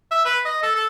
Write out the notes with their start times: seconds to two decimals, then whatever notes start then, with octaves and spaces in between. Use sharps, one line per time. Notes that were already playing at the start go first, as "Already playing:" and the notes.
0.11 E5
0.25 B4
0.45 D#5
0.63 A4
0.75 A4